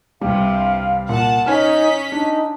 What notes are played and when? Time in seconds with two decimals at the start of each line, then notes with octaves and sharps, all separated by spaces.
0.21 C2 G2 C3 G3 F5
1.09 A#2 F#5 A5
1.46 C#4 D#4 C#5 G#5 F6 B6
2.12 D4 D#4